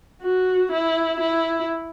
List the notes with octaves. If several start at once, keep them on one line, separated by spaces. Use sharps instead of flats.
F#4
E4
E4